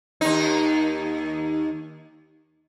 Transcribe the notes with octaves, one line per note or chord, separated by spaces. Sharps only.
D#2 D#4